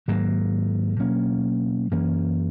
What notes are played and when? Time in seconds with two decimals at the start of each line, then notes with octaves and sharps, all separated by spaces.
0.08 G#2 D#3 F#3 A#3
0.99 B2 F#3 A#3 C#4
1.91 F#2 E3 A#3 C#4